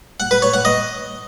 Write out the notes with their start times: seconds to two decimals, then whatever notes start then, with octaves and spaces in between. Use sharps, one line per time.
0.20 F#5
0.31 B4
0.42 C#5
0.54 F#5
0.65 D#5